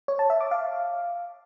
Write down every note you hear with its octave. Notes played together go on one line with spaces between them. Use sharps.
C#5
A5
E5
D6
F5